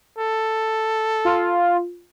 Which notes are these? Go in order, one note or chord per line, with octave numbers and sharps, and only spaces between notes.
A4
F4